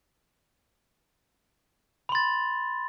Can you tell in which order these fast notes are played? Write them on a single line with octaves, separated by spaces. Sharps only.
B5 C6 A6